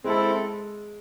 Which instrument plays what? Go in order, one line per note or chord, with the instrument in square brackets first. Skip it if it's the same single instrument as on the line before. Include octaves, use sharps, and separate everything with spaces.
[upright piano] G#3 [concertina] C4 E4 A4